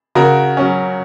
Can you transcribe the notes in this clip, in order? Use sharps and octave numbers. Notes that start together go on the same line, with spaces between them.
C#3 F#4 A#4
F#3 C#4